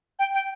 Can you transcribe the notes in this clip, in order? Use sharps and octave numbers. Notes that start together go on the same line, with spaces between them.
G5
G5